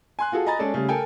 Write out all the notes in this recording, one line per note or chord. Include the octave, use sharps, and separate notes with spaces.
G#5 C6 F#6
F4 F#4 G#4 A4
D#5 G#5 A#5 B5 A6
G#3 C#4 G#4 A4 D5
C#3 G3 A3
A4 A#4 G5 G#5